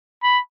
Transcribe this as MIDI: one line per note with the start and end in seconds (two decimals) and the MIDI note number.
0.23 0.40 83